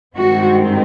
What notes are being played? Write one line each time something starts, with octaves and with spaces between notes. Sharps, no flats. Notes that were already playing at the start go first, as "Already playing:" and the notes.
G2 D#3 G#3 C4 F#4